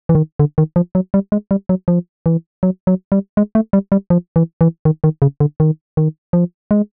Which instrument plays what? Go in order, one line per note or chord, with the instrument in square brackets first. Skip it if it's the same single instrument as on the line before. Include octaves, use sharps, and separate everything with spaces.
[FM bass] E3
D#3
D3
D#3
F3
F#3
G3
G#3
G3
F#3
F3
E3
F#3
F#3
G3
G#3
A3
G3
G3
F3
E3
E3
D#3
D#3
C#3
D3
D#3
D#3
F3
G#3